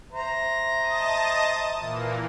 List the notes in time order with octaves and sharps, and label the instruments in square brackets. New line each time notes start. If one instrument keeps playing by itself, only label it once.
[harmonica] C5 A#5 [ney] E5
[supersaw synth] D#5 A5 D#6
A#2 E3 A#3